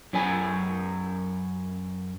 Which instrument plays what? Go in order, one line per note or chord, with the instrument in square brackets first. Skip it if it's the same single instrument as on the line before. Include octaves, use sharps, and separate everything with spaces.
[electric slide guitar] F#2 C#4 B4 G#5